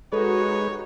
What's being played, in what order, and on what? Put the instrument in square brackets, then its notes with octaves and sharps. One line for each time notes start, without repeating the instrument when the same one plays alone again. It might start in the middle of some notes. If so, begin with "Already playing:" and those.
[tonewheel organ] G#3 B4 [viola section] D#4 F#4 G4 [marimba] A4 [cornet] C#5